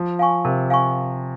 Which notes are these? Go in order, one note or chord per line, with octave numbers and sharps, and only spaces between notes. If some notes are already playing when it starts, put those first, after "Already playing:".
Already playing: F3
F5 G#5 C#6
C3 A#4
F5 G#5 C#6